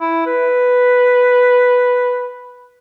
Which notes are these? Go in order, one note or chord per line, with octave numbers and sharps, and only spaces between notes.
E4
B4